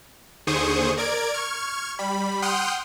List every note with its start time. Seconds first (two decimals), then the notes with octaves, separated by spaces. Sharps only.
0.47 D#2 D3 G#4 C5 C#6 D#6
0.97 A#4 D5 G#6 D7
1.33 C#6 F6 G#6
1.99 G3 B5
2.42 F#5 G5 C6 D#6 F6 G6